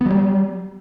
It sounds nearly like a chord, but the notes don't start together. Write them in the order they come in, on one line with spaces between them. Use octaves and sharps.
B3 F#3 G3